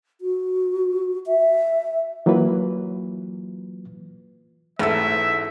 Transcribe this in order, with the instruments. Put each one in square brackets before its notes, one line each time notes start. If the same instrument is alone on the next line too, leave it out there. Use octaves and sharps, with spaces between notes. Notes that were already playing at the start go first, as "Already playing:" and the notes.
[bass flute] F#4
E5
[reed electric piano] E3 F#3 A#3 F4 B4
[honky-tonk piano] A1 E6 [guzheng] G#2 A3 [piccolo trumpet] E5